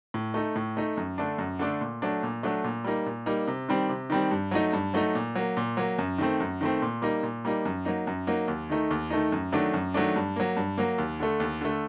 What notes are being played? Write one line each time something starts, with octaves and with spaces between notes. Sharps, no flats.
A2
A3 D#4
A2
A3 D#4
F#2
D3 A3 D4
F#2
D3 A3 D4
A#2
F#3 A3 D4
A#2
F#3 A3 D4
A#2
G3 A#3 D#4
A#2
G3 A#3 D#4
C3
D#3 G3 C4
C3
D#3 G3 C4
G2
F#3 A3 D#4
G2
F#3 A3 D#4
A#2
F#3 A#3
A#2
F#3 A#3
F#2
D#3 A3 C4
F#2
D#3 A3 C4
A#2
G3 A#3 D#4
A#2
G3 A#3 D#4
F#2
F#3 A#3 D#4
F#2
F#3 A#3 D#4
D#2
D#3 A3 D#4
D#2
D#3 A3 D#4
F#2
D#3 F#3 A3 D4
F#2
D#3 F#3 A3 D4
G2
F#3 A#3
G2
F#3 A#3
D#2
D3 A3
D#2
D3 A3